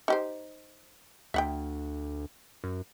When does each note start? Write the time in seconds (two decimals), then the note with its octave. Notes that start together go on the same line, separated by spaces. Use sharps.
0.08 D#4 G4 C5
1.34 D2 E5 F#5 G5
2.64 F#2